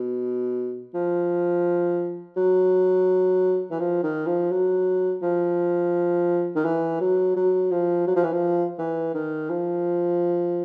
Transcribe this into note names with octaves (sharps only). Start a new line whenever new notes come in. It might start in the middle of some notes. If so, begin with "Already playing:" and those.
Already playing: B2
F3
F#3
E3
F3
D#3
F3
F#3
F3
D#3
E3
F#3
F#3
F3
F#3
F3
E3
F3
E3
D#3
F3